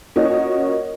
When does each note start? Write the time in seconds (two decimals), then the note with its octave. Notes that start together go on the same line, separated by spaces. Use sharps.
0.16 A#3 C#4 F4 F#4 C#5 D#5